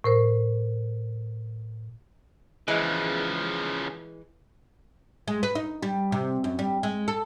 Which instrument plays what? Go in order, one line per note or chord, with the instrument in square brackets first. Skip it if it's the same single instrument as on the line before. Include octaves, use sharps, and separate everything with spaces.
[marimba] A2 A#4 C5
[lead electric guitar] C#3 F3 [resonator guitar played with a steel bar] E3 G#3
[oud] G#3
B4
D#4
G3
C3
F#2
G3
G#3
A4